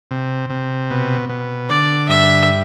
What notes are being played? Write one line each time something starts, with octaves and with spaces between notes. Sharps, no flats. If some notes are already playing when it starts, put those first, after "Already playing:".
C3
C3
B2
B2
D3 D5
G2 E5